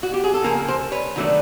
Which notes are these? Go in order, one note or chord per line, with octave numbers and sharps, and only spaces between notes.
F#4
G4
G#4
A4
C#3 F3 A#3 G#4 A#4
A#4 C5
B4 C#5
D#3 F#3 A3 D4